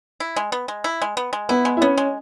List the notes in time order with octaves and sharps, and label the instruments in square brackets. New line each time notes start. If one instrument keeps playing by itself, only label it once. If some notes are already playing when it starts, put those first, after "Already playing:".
[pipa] E4
G#3
B3
G#3
E4
G#3
B3
G#3
[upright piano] B3 [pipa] E4
[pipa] G#3
[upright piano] E4
[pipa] B3 [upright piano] C#4
[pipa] G#3